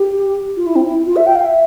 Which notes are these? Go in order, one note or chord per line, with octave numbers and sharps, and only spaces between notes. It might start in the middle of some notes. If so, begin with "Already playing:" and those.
Already playing: G4
F4
E4
C4
E4
F4
E5
G5
F5
E5